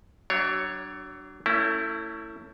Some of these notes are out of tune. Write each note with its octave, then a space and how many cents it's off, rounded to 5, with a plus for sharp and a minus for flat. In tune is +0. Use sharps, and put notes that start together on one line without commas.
F#3 +30 D4 +5 C#5 +0
A3 +30 C#4 +10 E4 +0